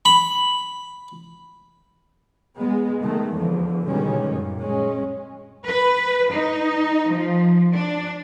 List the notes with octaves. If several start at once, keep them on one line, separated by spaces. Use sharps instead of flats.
B5
G#3 B3
D#3 G#3 A3
E2 D3 F3
B2 D3 D#3 G3 G#3 C#4
F#2 A#2
G#3 C#4
B4
D#4
F3
D4